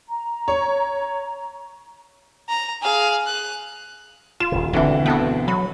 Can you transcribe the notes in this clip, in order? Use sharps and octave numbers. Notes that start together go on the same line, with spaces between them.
A#5
C#5
A#5
G#4 F5
F#6
F4 E7
D#1 C#3
E1 D2 B2 D3 E3 C4 F#4
B3 F#4 A4 G5
F#3 B5